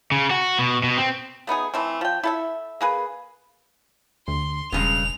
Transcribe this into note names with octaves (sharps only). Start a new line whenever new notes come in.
C#3
F#4
B2
B2
C4
A3 B3 D#4 G#4
E3 A3 C4
F3 G5
E4 A4 E5
A#3 G#4 B4
D2 C6
E1 G2 C#3 G#3 F7